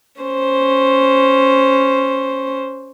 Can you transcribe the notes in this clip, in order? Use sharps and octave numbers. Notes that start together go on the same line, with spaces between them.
C#4 C5